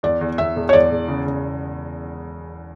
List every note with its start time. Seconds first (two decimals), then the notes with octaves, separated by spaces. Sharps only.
0.03 E2 D5
0.21 E2
0.38 E2 E5
0.56 E1
0.69 C#5
0.73 E2 D5
0.91 E1
1.08 C#3
1.25 C#3